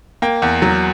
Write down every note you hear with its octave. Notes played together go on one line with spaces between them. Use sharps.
A#3 G5
E2
F#3